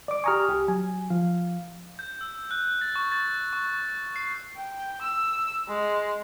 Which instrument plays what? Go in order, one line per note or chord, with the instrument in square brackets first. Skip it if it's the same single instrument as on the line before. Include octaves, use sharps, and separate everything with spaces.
[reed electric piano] D5 D6
[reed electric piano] G4 A#5 C#6 [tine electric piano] G#5 D#6 F6
[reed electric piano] C2 G4
[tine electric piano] F#3 [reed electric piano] G#5
[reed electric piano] F3 [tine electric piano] F5
[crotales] G6
E6
F#6
A6
C#6
A6
C#6
C7
[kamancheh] G5
E6
G#3